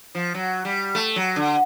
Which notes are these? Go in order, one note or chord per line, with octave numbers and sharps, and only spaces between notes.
F3
F#3
G3
A3
F#3
D3